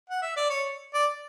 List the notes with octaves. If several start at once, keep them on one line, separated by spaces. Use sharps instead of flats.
F#5
E5
D5
C#5
D5